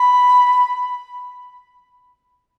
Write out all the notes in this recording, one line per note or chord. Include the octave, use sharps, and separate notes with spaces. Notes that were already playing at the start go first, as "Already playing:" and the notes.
Already playing: B5